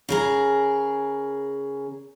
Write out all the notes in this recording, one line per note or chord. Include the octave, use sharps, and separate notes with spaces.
C#3 G#4 A#4